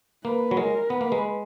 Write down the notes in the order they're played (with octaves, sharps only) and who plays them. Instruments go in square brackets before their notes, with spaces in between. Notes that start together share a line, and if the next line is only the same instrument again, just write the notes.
[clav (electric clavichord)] A#3 [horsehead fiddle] B4
[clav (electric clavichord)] F#3
[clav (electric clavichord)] G#3 [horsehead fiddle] A#4
[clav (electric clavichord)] B3 [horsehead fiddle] B4
[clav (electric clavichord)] A#3
G#3